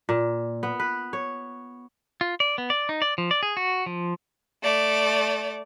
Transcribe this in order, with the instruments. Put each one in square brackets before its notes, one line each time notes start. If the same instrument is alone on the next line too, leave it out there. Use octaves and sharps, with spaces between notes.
[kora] A#2
B3
B4
C#5
[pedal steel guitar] F4
D5
B3
D5
D#4
D5
F3
D5
G#4
F#4
F3
[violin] A3 D5